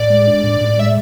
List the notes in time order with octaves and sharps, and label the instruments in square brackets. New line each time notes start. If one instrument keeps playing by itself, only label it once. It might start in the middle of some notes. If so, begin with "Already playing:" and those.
Already playing: [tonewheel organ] A2 [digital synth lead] D5
[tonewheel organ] G#3
D4
A2
A2
[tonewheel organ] G#3 [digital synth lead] E5